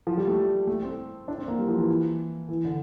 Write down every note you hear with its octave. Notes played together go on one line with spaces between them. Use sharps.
F3
G3
A3
A3
C4
D4
C4
A#3
G3
F3
E3
E3
D3